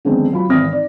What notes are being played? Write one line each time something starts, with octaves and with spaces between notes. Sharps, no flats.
D3 D#3 F3 G#3 B3 C4
F#3 F4 B5
G#1 E3 C4 D#6 F6 A#6
D#4 D5